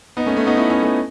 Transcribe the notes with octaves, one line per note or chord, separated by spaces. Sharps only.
B3 D#4
A3 C#4
A3 C#4
B3 D#4
C#4 E4
C#4 E4
A3 C#4